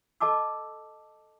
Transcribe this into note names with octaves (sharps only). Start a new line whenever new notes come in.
A4 D#5 A5 D6 E6